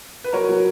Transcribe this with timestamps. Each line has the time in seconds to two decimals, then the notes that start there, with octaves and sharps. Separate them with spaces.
0.24 B4
0.33 F#3 A#4 C#5
0.49 F#3